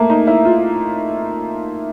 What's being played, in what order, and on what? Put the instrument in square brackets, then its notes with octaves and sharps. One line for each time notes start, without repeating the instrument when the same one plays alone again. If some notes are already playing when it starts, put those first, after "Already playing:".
Already playing: [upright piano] A3 A#3
D#4
E4
F4